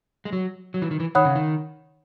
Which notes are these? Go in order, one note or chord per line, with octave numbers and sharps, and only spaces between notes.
G#3
F#3
F#3
E3
D#3
E3
D#3 C#5 F#5 B5 D#6 F#6
C#3
D#3